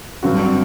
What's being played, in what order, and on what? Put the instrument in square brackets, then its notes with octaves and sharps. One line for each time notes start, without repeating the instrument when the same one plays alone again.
[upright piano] G2 D3 F#3 C4 F#4